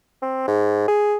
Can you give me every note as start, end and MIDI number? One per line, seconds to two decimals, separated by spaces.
0.22 0.46 60
0.47 0.84 44
0.88 1.17 68